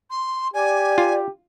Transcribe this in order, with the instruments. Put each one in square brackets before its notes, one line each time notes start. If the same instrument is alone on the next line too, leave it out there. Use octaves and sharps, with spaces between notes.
[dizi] C6
[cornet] G4 [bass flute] D5 [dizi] G#5
[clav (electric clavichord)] F4